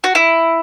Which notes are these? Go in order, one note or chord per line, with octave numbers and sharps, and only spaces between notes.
F#4
E4